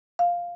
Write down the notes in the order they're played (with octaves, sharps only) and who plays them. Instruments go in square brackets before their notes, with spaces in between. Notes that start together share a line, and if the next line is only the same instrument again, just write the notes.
[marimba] F5